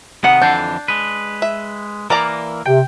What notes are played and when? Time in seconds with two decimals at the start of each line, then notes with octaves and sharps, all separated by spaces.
0.24 C3 D#3 B3 F#5
0.42 F2 D3 E3 D4 G6 C7
0.88 G#3 B4
1.42 E5
2.10 E3 A#3 A#4 D5 A#5
2.65 C3 G5